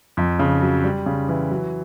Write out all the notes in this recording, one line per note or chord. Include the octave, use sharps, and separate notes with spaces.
F2
C#3
F#3
G3
C#3
E3
F#3